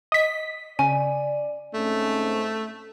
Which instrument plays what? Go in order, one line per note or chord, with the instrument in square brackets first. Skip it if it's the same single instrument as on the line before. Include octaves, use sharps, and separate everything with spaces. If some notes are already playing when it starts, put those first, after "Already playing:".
[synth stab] D#5 B6
[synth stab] C#3 [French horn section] D5 [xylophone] G#5
[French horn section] G#2 C4 C#4 [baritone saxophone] A3